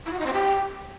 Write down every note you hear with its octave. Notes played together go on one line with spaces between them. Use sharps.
E4
F#4
D#4
C4
G4